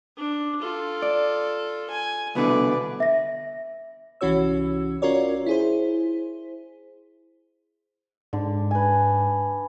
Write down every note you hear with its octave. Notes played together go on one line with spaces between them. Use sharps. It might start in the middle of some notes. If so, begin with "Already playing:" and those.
D4
F4 A4
D5
G#5
C2 B2 D3 B4 D5
E5 A#6
C2 E3 C#4 F#4 C#5 E6
C#4 F4 F#4 A#4 C#5 D5
E4 G#4 C5
G#2 D3
B4 G#5